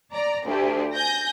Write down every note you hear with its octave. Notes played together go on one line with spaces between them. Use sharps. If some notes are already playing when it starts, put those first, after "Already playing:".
D5 A#5
D2 G4
G#5 G6 A#6